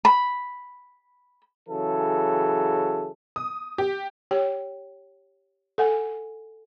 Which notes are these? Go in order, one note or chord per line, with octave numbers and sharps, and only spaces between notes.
B5
C#3 E3 F#3 G#4 A4
D#6
G4
G4 C#5 G5
A4 F#5 G#5